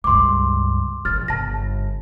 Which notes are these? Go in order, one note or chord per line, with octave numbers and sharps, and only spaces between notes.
C#2 G2 C6 D6
A#1 F6 A6
G1 C#3 A5 A#6